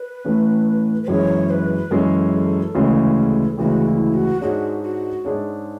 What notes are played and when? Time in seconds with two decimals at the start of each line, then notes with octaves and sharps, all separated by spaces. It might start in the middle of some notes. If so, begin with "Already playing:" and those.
Already playing: B4
0.25 A2 E3 A3 C#4
1.03 B4
1.07 F#2 E3 G#3 C#4 G#4 C#5
1.50 B4
1.91 F#2 E3 G#3 C#4 G#4 A4
2.75 D2 C#3 E3 G#3 C#4
3.57 D2 C#3 E3 G#3 C#4 F#4
3.86 E4
4.14 F#4
4.41 G#2 G#3 D4 F#4 G#4 C#5
4.83 F#4
5.25 G#2 G#3 D4 G#4 C#5